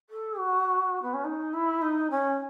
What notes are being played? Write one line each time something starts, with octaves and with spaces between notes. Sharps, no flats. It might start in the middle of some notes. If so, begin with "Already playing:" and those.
A4
F#4
B3
C#4
D#4
E4
D#4
C#4